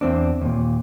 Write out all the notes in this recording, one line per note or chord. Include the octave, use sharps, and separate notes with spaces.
E2 C4 D4
D#2 A#2